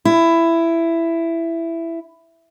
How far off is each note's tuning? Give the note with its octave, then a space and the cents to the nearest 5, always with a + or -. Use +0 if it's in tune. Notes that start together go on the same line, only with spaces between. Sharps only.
E4 +10